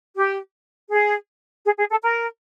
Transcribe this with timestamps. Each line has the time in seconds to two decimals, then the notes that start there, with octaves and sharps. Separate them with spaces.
0.15 G4
0.90 G#4
1.65 G#4
1.78 G#4
1.90 A4
2.02 A#4